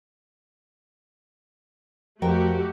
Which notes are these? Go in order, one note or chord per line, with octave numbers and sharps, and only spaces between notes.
F2 A3 F#4 G4 A#4 G5